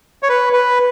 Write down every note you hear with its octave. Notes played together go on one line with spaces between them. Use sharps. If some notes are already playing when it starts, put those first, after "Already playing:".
C#5
B4
B4